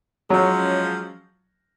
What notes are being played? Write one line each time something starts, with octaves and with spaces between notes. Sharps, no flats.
F3 F#3 G#3 C#4